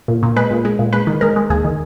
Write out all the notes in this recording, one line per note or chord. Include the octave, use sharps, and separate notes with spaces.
A#2
A#2
G#3 B4
A#2
G#3
A#2
G#3 B4
D#3
G#3 A#4
G#3
D#2 G#4
D#3